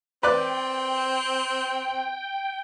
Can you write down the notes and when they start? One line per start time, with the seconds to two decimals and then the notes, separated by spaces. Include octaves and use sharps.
0.23 C4 B4 D5 G5 F#6